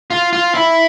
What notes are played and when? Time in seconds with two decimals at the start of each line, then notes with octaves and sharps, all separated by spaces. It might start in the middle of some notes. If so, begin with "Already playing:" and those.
0.10 F4
0.33 F4
0.54 E4